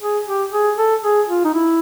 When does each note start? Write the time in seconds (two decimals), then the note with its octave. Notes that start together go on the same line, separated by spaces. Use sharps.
0.01 G#4
0.26 G4
0.52 G#4
0.77 A4
1.03 G#4
1.29 F4
1.45 D#4
1.54 E4